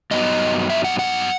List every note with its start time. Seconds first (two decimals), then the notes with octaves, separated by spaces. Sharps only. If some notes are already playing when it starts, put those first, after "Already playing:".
0.11 G2 F#3 B3 D#4 D#5
0.70 E5
0.84 F#5
0.99 F#5